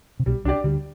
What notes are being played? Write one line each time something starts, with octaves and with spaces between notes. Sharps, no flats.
C3
B1 B2 G3
C2 C3 D4 G4 D5
D2 D3 G3